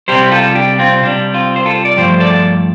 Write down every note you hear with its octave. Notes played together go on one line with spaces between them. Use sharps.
C3 G3 G4 C5
F4 A4
D4 G4
C4 F4
C3 G3 D4
C4 F4
C5
F4 A4
D5
G2 F3 A3 G4 C5
A4 D5